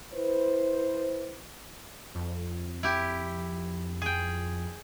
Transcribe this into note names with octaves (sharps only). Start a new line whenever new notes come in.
E4 B4 C5
F2
E4 G4
G#4 G5